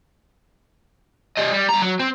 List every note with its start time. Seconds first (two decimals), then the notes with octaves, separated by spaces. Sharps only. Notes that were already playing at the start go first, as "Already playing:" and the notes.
1.38 G3 D#5
1.54 G3
1.69 G2 A#5
1.82 F#3
2.00 C4